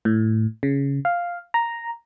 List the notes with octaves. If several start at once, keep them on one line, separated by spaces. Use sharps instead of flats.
A2
C#3
F5
A#5